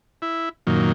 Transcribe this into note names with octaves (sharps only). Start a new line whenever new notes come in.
E4
F#2 A#2 D#3